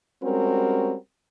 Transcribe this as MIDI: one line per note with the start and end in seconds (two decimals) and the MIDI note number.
0.22 0.94 55
0.22 0.94 56
0.22 0.94 60
0.22 0.94 61
0.22 0.94 66
0.22 0.94 70